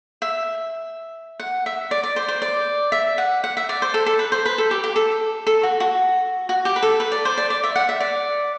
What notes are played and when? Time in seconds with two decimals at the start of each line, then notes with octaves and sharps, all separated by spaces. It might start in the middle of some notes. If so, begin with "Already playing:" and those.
0.22 E5
1.40 F#5
1.66 E5
1.91 D5
2.03 D5
2.16 C5
2.28 C5
2.42 D5
2.92 E5
3.18 F#5
3.44 F#5
3.57 E5
3.69 D5
3.82 C5
3.94 A4
4.06 A4
4.19 B4
4.32 C5
4.45 B4
4.58 A4
4.71 G4
4.84 G4
4.96 A4
5.47 A4
5.63 F#4
5.80 F#4
6.49 F#4
6.65 G4
6.76 B4
6.82 A4
7.00 B4
7.12 D5
7.25 C5
7.38 D5
7.50 D5
7.63 E5
7.76 F#5
7.89 E5
8.00 D5